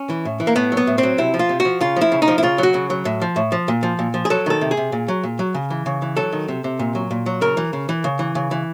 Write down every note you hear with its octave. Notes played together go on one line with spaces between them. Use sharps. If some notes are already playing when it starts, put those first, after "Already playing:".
Already playing: C#4
E3
A2
E3
A#3
A2 B3
F#3
B3
A2
C4
F#3
C3 E4
F3
F4
C3
F#4
F3
C#3 F4
F3
E4
C#3
D#4
F3
E4
C#3 F4
F#3 F#4
C#3
F#3
A2
F3
A2
F3
A#2
F3
A#2
F3
G#4
F#3 A4
D#3 A4
C3
G#4
C3
A#2
F#3
A#2
F#3
C#3
E3
C#3
E3
F#3 A4
D#3
C3
C3
A#2
F#3
A#2
F#3
C#3 A#4
E3
C#3
E3
C#3
E3
C#3
E3